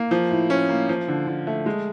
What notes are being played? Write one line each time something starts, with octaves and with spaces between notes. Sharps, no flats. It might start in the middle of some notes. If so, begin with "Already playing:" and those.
Already playing: A#3
F3
A2
C#4
A#3
F3
D3
D3
A3
G#3